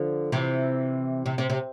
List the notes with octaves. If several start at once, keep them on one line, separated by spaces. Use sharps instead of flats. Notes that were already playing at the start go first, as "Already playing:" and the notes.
Already playing: D3 F3
C3 E3
C3
C3
C3